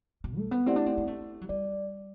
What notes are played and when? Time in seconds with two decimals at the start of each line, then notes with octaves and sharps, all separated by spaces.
0.24 B2
0.38 A3
0.51 B3
0.66 A3 C4 E4 G4 D5 F#5
0.76 D4
0.86 C4
0.98 C4
1.07 A3
1.41 F#3
1.49 G3 D5